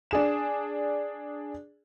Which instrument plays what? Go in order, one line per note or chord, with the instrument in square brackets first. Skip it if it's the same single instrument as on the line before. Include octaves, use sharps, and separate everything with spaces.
[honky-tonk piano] D4 G#4 E7